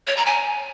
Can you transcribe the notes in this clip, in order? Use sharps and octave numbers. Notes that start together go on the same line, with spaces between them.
C#5
A#5
G#5